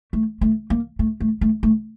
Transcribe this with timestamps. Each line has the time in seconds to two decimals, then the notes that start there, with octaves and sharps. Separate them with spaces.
0.13 A3
0.41 A3
0.70 A#3
0.99 A3
1.20 A3
1.41 A3
1.63 A3